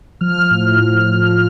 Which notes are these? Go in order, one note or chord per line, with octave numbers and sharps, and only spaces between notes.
F3 F6
A2
A2
F3